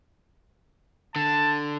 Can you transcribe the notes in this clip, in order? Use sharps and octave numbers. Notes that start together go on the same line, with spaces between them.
D3 A5